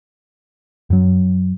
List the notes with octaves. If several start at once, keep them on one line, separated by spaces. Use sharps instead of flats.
F#2 F#3